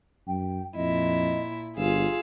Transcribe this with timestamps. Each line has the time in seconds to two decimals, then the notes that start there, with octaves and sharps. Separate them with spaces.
0.28 F#2 G5
0.75 F2 A#2 E4 D#5
1.77 G1 F4 G#4 F5 E6